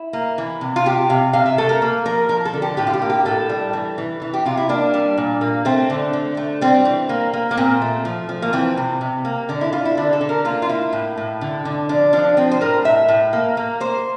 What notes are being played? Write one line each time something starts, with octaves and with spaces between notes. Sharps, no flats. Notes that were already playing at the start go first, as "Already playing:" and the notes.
Already playing: E4
A#3
E3
C3
F4
C3 G4
C3 F5
C3 F5
E5
A3 A4
A#4
A#3
F3 A#4
F3 A#4
A4
D3
G4
A2 G4
F4
G4
A#3
G4
A2 A4
G3
E3
E3
E3
G4
C3 F4
E4
A#3 D4
G3
A#2
A#3
A3 C4
D3
D3
A3
G3 C4
E3
A#3
A#3
A#3
A#2 C4
A3
F3
F3
A#3
E3 C4
C3
C3
A#3
D3 D4
E4
D3 F4
E4
D3 D4
A4
D3
A#4
A#3 F4
F4
A#3 E4
A2
A2
D3
D3
F3 D4
F3 D4
F3 C4
C5
A2 A#4
A2 E5
A2
A#3
A#3
A#3 C5